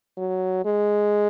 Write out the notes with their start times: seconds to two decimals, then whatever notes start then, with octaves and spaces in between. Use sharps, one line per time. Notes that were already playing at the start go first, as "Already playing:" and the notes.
0.18 F#3
0.65 G#3